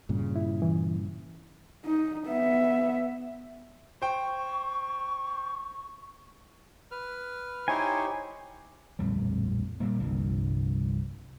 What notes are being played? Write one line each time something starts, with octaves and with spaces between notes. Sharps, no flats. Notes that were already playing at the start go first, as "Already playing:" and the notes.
G2 A#2 C#3
E4
E3
D#4
B3 E5
C5 G5 C#6
B4 F6
D#4 E4 G4 C5 C#5 G#5
D1 A#1 F2 G3
A#2 G3 A#3
G1 C2 G2 F3